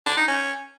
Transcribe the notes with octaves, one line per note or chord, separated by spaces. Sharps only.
D4
D#4
C#4